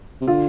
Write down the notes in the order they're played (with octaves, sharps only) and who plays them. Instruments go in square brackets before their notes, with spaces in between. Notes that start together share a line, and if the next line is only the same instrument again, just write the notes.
[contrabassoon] C3
[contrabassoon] D3 [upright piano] F4